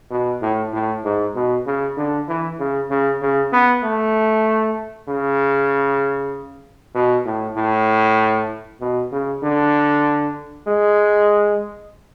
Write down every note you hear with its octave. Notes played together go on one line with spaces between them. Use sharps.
B2
A2
A2
G#2
B2
C#3
D3
E3
C#3
C#3
C#3
B3
A3
C#3
B2
A2
A2
B2
C#3
D3
G#3